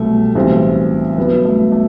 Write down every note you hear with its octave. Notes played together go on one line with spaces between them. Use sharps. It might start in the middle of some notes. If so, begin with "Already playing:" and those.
Already playing: C2 B2 F#3 A3
B1 A2 E3 G3 C4
G1 F#2 F#3 B3
A3
A3